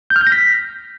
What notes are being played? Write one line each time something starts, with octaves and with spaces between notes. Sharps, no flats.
G6
F6
G6
A#6
B6